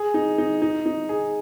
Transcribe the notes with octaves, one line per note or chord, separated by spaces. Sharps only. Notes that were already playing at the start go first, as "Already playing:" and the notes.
Already playing: G#4
D#4
D#4
D#4
D#4
G#4